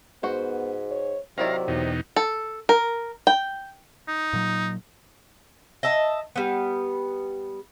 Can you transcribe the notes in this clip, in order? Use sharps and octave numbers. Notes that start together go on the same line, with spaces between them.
G#2 B3 F#4 C5
C#5
C3 D#3 F#3 E4 D5 F5 A#5
E2 B2 D#4
A4
A#4
G5
D#4
A#2 F#3
D#5 E5 A5
G3 B3